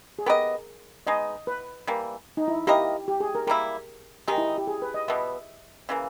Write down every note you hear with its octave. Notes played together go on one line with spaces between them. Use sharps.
G#4
B3 G4 A#4 B4 D#5
G#3 B3 D#4 D#5
B4
E3 G3 A#3
D#4
E4
A#3 E4 G4 A#4 D#5
G4
G#4
A#4
G3 A#3 E4 A#4
D#3 G#3 D#4 G4
E4
G4
G#4
B4
D#5
B2 G3 B3 E5
C#3 E3 A#3